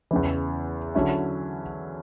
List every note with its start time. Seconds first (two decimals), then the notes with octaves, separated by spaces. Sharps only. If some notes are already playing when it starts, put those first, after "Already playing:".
0.11 E2 C#3 E3
0.95 D3 F#3 C#4 E4